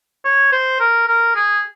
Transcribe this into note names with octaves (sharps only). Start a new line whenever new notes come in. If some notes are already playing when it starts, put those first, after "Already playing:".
C#5
C5
A#4
A#4
G#4